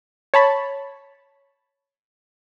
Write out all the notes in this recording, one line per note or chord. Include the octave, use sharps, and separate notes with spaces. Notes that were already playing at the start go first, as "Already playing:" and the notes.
C#5 A5 B5